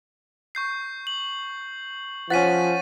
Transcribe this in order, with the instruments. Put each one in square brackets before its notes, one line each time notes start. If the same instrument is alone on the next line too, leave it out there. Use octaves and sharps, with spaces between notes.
[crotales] C#6 G6 C7
F#7
[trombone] F3 [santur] C#4 F#5 [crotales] A6 B6 D#7